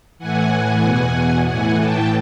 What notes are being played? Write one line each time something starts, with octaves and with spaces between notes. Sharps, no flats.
A2 E3 F#5 G#5
E2 B2
A2 E3 F#5 G#5
G5 A5